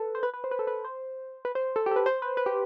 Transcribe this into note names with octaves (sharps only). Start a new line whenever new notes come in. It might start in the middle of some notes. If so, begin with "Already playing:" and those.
Already playing: A4 B4
C5
B4
B4
C5
B4
A4
B4
C5
B4
C5
A4
G4
A4
B4
C5
B4
B4
G4